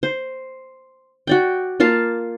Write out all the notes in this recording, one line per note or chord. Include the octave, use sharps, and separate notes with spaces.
C5
F#4 D5 G5
A#3 F4 F5 A5